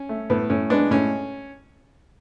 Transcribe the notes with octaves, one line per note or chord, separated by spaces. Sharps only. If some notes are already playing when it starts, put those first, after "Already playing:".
Already playing: C#4
A3
A2 B3
A2 C#4
G#3 B3 D4
A2 C#4